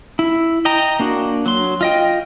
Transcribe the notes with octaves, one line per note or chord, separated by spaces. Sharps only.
E4
D#5 G5 A#5
A#3 D4 F#4
F#3 C6
F4 D#5 G5